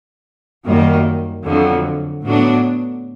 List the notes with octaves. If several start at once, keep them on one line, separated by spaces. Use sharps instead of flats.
F#2 D#3 G3 A#3
F2 D3 F#3
A2 F#3 B3 D4